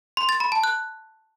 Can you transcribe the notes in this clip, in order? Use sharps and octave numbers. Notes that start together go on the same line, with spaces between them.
C6
A6
B5
A5
F#6